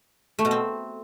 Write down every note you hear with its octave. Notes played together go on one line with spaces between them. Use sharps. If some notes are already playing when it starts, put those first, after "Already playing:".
A3
B2
C4